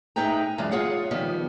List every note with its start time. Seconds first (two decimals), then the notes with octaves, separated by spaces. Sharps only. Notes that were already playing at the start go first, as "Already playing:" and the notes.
0.16 A2 D#4 G#4 B4 G5 A#5
0.58 F#2 E3 G#3 F4 D5
0.71 F4 G#4 C#5 F5 F#5
1.11 D#3 F3 G3 B3